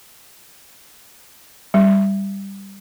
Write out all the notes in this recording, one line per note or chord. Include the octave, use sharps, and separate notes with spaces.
G3